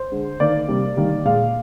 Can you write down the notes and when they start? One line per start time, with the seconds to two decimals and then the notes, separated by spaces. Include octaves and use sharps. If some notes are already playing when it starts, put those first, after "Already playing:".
Already playing: C5
0.12 D3 G#3
0.40 D#3 A#3 D5
0.68 C3 G3 A#3
0.97 D#3 G3 A#3
1.25 A#2 G#3 F5